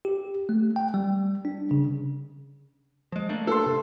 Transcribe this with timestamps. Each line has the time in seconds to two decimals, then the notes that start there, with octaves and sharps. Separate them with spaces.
0.05 G4
0.49 A3
0.76 G5
0.94 G3
1.45 D4
1.71 C#3
3.12 F3 G#3
3.29 A3 A#3 D4
3.47 A4 C6
3.66 C3